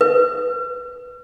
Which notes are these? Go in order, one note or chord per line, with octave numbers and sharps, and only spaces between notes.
B4